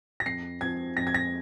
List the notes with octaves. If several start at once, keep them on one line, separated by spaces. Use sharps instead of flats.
A#6
F2 C7
F3 C4 G#6
F2 A#6
G#6
A#6